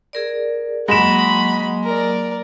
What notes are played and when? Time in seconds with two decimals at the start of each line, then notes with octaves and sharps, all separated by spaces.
0.13 G#4 A#4 D5
0.88 F#3 G#3 A#3 F#4 B5 E7
1.84 A#4 D5